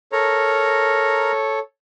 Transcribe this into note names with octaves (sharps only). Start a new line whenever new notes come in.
A4 A#4 C#5 A#5